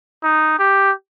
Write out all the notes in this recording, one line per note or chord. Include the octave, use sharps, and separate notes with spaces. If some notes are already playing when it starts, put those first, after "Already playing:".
D#4
G4